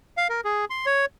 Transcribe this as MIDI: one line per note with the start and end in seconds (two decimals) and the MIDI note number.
0.17 0.28 77
0.29 0.41 70
0.45 0.65 68
0.70 0.86 84
0.86 1.05 73